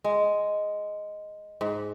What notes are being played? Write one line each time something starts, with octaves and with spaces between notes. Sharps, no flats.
G#3
G#2